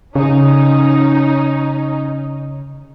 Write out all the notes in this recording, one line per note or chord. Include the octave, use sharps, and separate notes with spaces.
C#3 C#4 D#4